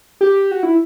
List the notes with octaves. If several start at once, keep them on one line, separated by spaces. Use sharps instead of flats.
G4
F#4
E4